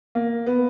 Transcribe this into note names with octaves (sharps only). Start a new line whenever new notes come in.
A#3
B3